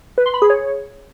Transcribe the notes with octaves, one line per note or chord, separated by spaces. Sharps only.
B4
C6
B5
G#4
C#5